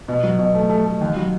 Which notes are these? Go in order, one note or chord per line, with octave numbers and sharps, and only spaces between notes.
B2
F#3
B2
A3
A3
A3
D#2
F#3